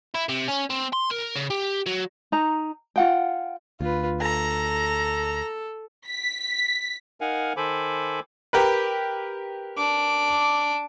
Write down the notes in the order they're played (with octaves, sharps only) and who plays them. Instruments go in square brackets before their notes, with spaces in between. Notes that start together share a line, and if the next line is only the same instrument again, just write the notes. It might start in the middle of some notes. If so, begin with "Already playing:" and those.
[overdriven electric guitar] E4
C3
C#4
C4
C6
A#4
C#3
G4
F#3
[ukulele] D#4 A#5
F4 F#5 G5
[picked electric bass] D2 [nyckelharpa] F4 B4
[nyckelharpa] A4 [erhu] A#5
[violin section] B6
[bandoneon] D#4 A#4 F5 F#5 G#5
D#3 A4 C5 G#5 B5 D6
[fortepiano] G4 A#4 B4
[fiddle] D4 D6